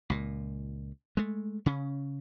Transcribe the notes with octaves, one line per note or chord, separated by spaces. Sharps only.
C#2 A#2
G#3 A3
C#3 C#4